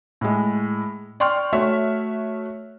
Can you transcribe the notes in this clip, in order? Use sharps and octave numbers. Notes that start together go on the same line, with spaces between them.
A2 G#3
D5 G5 C6 C#6 F6
A3 F#4 C#5 E5